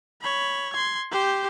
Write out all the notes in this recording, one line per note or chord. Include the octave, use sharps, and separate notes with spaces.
C#5 B5
C6 G#6
G4 C5